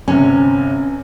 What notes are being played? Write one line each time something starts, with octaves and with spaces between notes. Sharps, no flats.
G1 C3 C#4 G#5